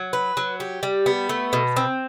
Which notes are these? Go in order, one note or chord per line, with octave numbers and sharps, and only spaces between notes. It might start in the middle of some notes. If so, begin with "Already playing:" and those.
Already playing: F#3
B4
F#3
G4
G3
B3
A3
B2
C4